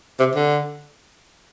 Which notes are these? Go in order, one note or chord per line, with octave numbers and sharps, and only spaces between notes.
C3
D3